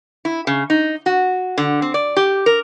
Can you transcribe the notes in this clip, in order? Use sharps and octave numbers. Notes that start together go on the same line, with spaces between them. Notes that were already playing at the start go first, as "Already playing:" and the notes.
E4
C#3
D#4
F#4
D3
C4
D5
G4
A#4